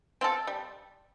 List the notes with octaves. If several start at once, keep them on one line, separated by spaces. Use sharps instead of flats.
C4 F4 A4
G3